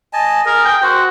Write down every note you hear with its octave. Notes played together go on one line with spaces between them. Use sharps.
D#5 G#5 A5
G#4 A#4
G5
F#4 C5